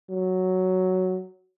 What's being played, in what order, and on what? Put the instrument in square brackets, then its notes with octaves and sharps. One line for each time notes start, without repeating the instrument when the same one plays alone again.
[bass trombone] F#3